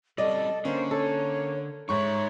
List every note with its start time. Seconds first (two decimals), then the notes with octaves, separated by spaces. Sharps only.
0.18 G3 C4 C#4 A4 D5 D#5
0.65 D3 A#3 C#4 C5
0.91 A4 C#5
1.89 G#2 D#4 C#5 E5 C#6